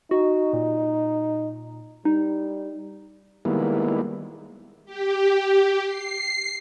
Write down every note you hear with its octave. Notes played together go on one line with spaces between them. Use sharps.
D#4 F#4
A#2
G3 D#4
D#3 G3 G#3 A#3 B3 E4
G4
C7